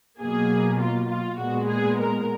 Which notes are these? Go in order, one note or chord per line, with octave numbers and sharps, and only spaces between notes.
B2 F#3 A#3 G#4
F4
F4
A#2 G#3 B3 F#4
G#4
A#4